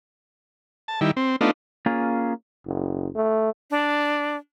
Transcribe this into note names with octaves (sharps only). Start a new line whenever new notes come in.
A5
D#3 G3 E4
C4
A3 B3 D4 D#4 F4
A#3 C#4 F4 G#4
F#1
A3
D4